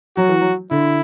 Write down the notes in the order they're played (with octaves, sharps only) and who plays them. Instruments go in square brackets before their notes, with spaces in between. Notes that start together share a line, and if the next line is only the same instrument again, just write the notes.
[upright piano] F#3 [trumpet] F#4
[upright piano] E3
F#3
[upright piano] D3 [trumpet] E4